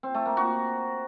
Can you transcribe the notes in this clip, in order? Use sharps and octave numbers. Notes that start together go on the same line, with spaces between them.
C4
A3
A#3
F#4